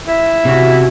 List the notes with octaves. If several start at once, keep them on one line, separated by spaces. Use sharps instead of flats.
E4
C3 C#4 F#4